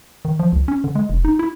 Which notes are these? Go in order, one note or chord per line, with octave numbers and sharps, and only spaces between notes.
D#3
F3
C#2
C#4
D3
G#3
E1
D#4
E4